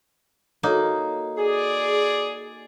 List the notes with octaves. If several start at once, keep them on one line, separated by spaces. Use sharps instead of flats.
A#3 D#4 F#4 A4 C#5
G#4 D5